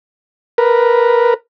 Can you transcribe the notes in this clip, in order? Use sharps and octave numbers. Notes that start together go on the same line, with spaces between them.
A#4 B4